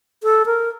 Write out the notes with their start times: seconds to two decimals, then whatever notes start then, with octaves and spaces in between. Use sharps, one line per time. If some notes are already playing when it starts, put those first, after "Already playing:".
0.23 A4
0.46 A#4